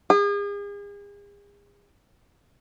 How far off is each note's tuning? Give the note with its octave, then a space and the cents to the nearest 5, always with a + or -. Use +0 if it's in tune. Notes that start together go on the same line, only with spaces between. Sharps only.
G#4 -40